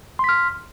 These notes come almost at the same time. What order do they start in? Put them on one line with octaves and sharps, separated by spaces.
C6 B6 F6